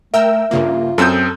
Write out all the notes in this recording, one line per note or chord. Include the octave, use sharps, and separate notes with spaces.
A3 A#4 E5 G5 E6
G2 C#3 A#3 F4
F#2 C4 A4 D#6 E6 G6